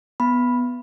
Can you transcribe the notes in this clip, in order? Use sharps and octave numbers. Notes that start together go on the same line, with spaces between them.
B3 B5